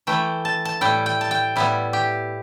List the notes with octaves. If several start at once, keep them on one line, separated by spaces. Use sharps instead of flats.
E3 A3 E4 G5
A5
A5
A2 G3 E4 G5
G5
A5
G5
A2 G3 B3 E4
G4